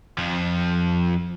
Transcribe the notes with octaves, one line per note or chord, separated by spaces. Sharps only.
F2 F3